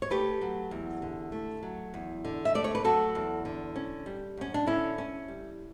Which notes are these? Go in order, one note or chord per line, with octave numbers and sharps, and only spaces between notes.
C#5
A3 G4 B4
F#3
E2
D3
A3
F#3
E2
D3
E5
A3 D5
C#5
B4
F#3 F#4 A4
E2
D3
C#4
G3
F#2 C#4
D4
D3 C#4 E4
C#4
G3